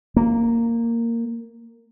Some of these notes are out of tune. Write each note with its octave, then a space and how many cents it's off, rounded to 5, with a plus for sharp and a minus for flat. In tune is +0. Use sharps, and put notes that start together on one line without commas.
A#3 -10